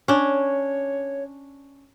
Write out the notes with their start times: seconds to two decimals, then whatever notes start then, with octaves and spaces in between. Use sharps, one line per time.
0.08 C#4 D4 C#5